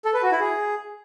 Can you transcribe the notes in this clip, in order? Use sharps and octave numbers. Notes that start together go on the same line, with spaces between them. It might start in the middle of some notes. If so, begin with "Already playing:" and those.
A4
B4
F#4
E4
G#4